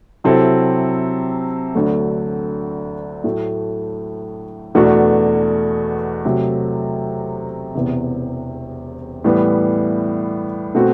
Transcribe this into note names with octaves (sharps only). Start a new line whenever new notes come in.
C3 F#3 C4 E4 A4
D2 D3 F#3 A3
A2 F#3 A3
E2 B2 A3 D4 F#4
C3 F#3 A3
E1 E2 C3
A2 E3 G3 B3
B2 A3 C4 F#4